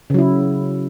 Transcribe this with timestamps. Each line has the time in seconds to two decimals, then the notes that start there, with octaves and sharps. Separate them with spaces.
0.10 C#3
0.14 F#3
0.19 E4